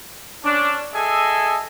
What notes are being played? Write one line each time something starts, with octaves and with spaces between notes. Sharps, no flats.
C#4 D4
G#4 A4 D#5 E5 G#5